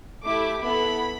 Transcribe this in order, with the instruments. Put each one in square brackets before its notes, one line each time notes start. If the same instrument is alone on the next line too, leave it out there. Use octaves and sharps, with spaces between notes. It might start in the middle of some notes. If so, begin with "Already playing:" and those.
[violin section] A3 E4 G4 D6
B3 E4 A4 B5